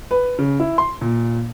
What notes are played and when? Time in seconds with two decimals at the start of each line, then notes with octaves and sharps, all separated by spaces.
0.11 B4
0.39 C#3
0.60 E4
0.78 C6
1.01 A#2